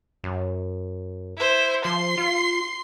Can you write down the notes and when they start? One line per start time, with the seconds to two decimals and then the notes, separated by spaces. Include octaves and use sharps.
0.24 F#2
1.37 E4 C5
1.85 F3 C6 C7
2.18 F4